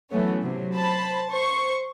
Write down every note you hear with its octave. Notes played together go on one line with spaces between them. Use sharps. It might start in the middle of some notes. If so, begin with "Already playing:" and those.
E3 F#3 A3 B3 C#4
C3 F#3
C5 A5 B5
C5 C#6